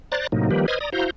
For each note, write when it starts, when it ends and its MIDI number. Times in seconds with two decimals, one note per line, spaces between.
0.12 0.27 72
0.12 0.27 74
0.12 0.27 82
0.12 0.27 90
0.12 0.27 93
0.32 0.50 45
0.32 0.50 48
0.32 0.50 54
0.32 0.50 58
0.32 0.50 63
0.51 0.66 51
0.51 0.66 53
0.51 0.66 55
0.51 0.66 58
0.51 0.66 67
0.51 0.66 71
0.68 0.79 71
0.68 0.79 72
0.68 0.79 75
0.68 0.79 87
0.68 0.79 89
0.68 0.79 92
0.80 0.90 74
0.80 0.90 82
0.80 0.90 87
0.92 1.10 64
0.92 1.10 66
0.92 1.10 72
0.92 1.10 77
0.92 1.10 82
0.92 1.10 91